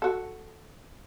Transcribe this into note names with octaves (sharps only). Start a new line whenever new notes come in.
F#4 A4